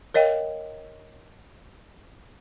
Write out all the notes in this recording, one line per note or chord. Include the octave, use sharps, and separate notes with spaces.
A#4 C#5 D#5 F5 G5